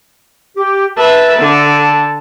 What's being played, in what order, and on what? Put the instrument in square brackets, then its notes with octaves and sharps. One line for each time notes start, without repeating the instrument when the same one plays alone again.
[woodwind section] G4
[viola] B4 E5 [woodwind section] A5
[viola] D3